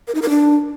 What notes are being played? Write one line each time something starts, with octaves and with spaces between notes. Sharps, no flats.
A#4
D#4
A#4
D4